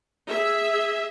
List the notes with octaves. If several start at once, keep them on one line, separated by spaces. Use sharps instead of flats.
G#4 E5